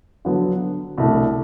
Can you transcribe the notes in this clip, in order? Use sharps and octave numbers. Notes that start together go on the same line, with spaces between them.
D3 F#3 B3
C2 B2 A3 D4